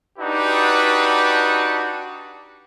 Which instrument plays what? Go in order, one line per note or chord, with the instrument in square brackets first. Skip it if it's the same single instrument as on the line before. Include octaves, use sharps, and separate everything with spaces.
[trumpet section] D4 D#4 F#4 G4 B4